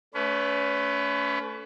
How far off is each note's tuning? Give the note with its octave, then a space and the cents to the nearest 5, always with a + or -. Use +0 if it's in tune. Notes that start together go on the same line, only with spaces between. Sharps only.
A3 +0 C#4 +35 B4 +25